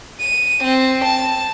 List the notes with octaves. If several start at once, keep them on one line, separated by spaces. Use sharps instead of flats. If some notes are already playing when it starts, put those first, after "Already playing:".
D#7
C4
A5